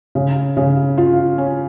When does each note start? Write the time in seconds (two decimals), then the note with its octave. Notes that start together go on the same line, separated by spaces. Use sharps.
0.15 C#3
0.57 C#3
0.98 F4
1.38 C#4